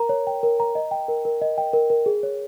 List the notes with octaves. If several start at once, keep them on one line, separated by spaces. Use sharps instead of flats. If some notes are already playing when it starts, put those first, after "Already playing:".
Already playing: A#4 A#5
C#5
G5
A#4
A#5
D#5
G5
A#4
A#4
D#5
G5
A#4
A#4
G#4
C#5